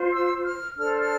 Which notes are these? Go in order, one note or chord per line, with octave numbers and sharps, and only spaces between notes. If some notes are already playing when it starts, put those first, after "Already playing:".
Already playing: F4 C5
E6
F6
D4 A4 C5 F6
F6